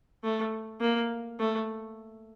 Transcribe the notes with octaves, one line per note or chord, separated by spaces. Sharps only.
A3
A#3
A3